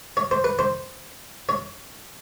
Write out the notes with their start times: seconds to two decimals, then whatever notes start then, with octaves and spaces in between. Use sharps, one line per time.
0.17 C#5
0.31 C5
0.44 B4
0.59 C5
1.49 C#5